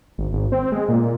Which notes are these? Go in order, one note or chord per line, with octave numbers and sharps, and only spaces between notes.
G#1
G#1
C4
G#3
A#2